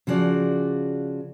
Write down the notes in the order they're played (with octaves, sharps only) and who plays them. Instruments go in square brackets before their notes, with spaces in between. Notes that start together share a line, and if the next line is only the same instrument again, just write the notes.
[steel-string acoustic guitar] C#3 F3 F#4 G#4 D5